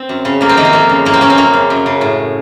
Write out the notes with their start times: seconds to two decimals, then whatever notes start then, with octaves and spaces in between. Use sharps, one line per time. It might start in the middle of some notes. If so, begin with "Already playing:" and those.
Already playing: C4
0.09 F#2
0.25 C#3
0.41 F2 A#3
0.49 C4
0.57 C3 D#3 A#3
0.65 C4
0.73 F2 A#3
0.89 C#3
1.05 A2 A#3
1.13 C4
1.21 A#3 C#4
1.30 C4
1.37 F#2 A#3
1.53 C#3
1.70 F#2
1.86 C#3
2.01 A2